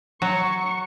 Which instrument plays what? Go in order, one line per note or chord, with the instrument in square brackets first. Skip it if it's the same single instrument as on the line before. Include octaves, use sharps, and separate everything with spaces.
[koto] F#3 [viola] C#6